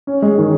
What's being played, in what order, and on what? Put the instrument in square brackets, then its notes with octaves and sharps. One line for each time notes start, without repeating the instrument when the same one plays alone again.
[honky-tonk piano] C#4
G#3
D#3